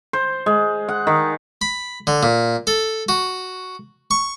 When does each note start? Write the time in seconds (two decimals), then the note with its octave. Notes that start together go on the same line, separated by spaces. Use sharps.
0.13 C5
0.46 G#3
0.89 F#5
1.07 D#3
1.61 B5
2.07 D3
2.23 A#2
2.67 A4
3.09 F#4
4.11 C#6